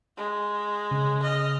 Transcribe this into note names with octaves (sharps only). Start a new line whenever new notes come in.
G#3
C#3
D#5 F6